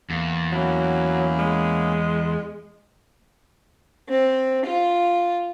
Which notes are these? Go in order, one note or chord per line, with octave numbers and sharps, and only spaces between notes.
E2 A#3
F#3 A#3 C#4 E4
G#3
C4
F4